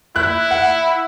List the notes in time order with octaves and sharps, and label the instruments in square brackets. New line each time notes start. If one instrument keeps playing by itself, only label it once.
[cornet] E4 [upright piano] F#6
[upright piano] F#5